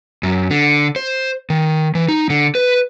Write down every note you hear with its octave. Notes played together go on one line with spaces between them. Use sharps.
F#2
D3
C5
D#3
E3
D#4
D3
B4